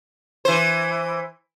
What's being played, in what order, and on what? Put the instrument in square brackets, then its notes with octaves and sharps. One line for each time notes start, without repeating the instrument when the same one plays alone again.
[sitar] E3 C5